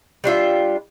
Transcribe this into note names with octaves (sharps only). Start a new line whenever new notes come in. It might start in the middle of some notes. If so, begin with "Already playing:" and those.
G3 D4 F4 E5